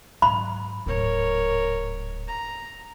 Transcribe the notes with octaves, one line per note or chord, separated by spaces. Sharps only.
G#2 F#3 B5
D1 G#2 A#4 C#5
A#5